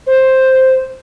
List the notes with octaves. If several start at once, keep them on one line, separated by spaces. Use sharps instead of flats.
C5